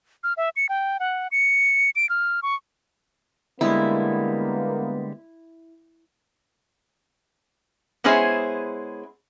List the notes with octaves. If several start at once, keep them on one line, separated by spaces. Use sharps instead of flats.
F6
E5
C#7
G5
F#5
C#7
D7
F6
C#6
D3 G3 G#3 A#3 B3 E4
G#3 B3 C#4 E4 G#4 C5